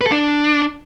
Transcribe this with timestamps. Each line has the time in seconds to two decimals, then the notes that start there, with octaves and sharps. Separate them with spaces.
0.01 B4
0.06 A4
0.12 D4